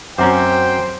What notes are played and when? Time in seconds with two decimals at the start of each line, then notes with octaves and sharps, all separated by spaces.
0.18 F#2 C4 C#4 F#4 C5 G5 A#5 D6